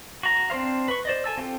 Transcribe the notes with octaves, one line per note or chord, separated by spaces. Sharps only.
F#4 A#5
C4 D4 C5 F5
B4 C#6
C5 D5 D#5
A4 G#5 A5 E6
C4 F4 G4 A4